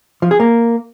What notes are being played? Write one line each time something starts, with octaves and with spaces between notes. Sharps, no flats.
F3
G#4
A#3